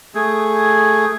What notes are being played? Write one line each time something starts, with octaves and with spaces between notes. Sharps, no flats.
A3 G#4